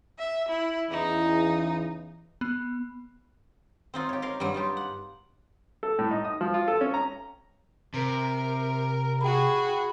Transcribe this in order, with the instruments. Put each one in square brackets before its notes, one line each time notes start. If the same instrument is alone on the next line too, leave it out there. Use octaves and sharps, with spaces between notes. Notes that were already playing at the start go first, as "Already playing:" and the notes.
[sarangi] E5
E4
[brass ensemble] E2 C#3 E3 [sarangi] D#4
[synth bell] B3
[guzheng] C4 D#4 F4
G4 C#5
A#4 F5 C6
G2 F#3 G3
D#4 F4 G4
F#5
[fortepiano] A4
A2
D#4
D#6
F3
F4
A4
C#4
A#5
[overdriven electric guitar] C3 [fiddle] A#4
[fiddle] F#4 G#4 [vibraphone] G5 B5